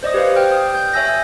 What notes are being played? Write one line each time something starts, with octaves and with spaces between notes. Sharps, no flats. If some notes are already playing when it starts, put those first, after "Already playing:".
C5 D5 D#5 D#6
G4 B4 C5 F5
G5 F6 G6
D#6
G6
C#5 E5 G#5 E6 G6 A#6